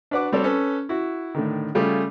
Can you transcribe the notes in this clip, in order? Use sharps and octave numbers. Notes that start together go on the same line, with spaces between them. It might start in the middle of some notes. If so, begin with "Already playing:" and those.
D4 F#4 B4 D5 F#5 D6
G3 C4 F#4 A4 C#5 D5
C#4 A4 B4
E4 F#4
A2 D3 D#3
C#3 G3 A3 F4 G#4